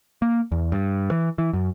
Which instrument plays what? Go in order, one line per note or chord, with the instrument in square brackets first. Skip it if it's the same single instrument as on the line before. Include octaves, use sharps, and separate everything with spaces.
[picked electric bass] A#3
E2
G2
E3
E3
F#2